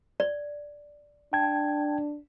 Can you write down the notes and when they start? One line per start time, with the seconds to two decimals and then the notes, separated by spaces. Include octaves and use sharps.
0.20 D5
1.33 D4 G5 A5 G#6